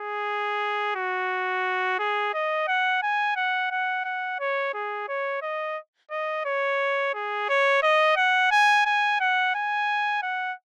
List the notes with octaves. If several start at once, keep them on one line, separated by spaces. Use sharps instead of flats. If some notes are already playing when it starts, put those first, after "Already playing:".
Already playing: G#4
F#4
G#4
D#5
F#5
G#5
F#5
F#5
F#5
C#5
G#4
C#5
D#5
D#5
C#5
G#4
C#5
D#5
F#5
G#5
G#5
F#5
G#5
F#5